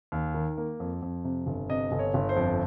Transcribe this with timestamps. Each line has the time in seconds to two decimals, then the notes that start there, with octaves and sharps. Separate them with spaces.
0.12 D#2
0.34 D#3
0.57 A#3
0.80 F2
1.02 F2
1.24 C3
1.47 G1
1.69 C3 D#5
1.92 G1
1.99 C#5
2.14 G1
2.29 C5
2.36 F2